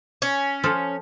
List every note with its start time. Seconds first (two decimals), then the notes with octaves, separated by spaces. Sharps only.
0.22 C#4
0.63 F3 F4 A4